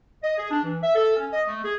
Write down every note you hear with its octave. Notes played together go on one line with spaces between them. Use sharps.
D#5
G#4
D4
E3
E5
A4
C#4
D#5
A3
G#4